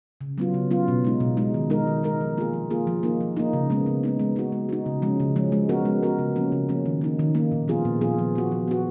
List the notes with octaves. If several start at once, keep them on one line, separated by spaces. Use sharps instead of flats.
C#3
F#3 B3 F4
C#3
F#3 B3 F4
B2
G#3 D#4
B2
G#3 D#4
D#3
G#3 D#4 A#4
D#3
G#3 D#4 A#4
F3
A#3 F4 G#4
F3
A#3 F4 G#4
F3
A#3 D#4
F3
A#3 D#4
C#3
G#3 B3 D#4
C#3
G#3 B3 D#4
G#3
D#4 F#4
G#3
D#4 F#4
C#3
F3 G#3 C#4
C#3
F3 G#3 C#4
G#3
B3 F#4 A#4
G#3
B3 F#4 A#4
C#3
F3 A#3 C#4
C#3
F3 A#3 C#4
D#3
A#3 D#4
D#3
A#3 D#4
A#2
F3 B3 F4 G#4
A#2
F3 B3 F4 G#4
F3
B3 F#4
F3
B3 F#4